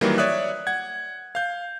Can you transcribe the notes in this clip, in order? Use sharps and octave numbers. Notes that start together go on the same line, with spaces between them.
D#3 E3 F#3 G3 A#3
C#5 D5 E5 D#6 F#6
F#5 G#6
F5 G6